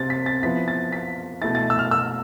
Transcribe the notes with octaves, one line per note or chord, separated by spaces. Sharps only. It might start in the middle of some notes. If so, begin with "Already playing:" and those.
Already playing: C3 C4 A6
B6
A6
F3 B3 E4 B6
A6
B6
B2 A3 E4 A6
A6
E6
F6
E6